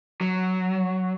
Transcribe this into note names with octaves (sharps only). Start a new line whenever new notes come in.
F#3